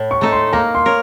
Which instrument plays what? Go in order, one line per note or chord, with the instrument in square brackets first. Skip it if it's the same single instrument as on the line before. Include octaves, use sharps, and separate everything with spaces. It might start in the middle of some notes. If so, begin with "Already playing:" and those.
Already playing: [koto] A2
[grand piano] C#6
[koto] A3 D#4 A4
[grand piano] C6
[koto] A#3 [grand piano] A#5
[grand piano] C6
[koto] A#4 C#5